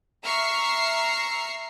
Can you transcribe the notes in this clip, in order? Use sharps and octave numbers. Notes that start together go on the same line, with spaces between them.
E5 A#5 C#6 F6 C7